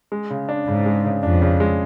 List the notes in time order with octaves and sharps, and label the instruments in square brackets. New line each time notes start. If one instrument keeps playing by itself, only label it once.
[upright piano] G#3
C#3
D4
[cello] G#2 [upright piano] C#3
[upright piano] G#3
C#3
[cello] F2 [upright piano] D4
[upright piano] C#3
G#3